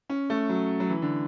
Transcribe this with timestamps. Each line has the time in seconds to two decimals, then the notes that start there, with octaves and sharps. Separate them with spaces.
0.09 C#4
0.30 A3
0.49 F#3
0.80 F#3
0.90 E3
1.02 D3